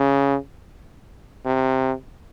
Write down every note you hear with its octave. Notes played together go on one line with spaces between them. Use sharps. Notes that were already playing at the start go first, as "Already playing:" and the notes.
Already playing: C#3
C3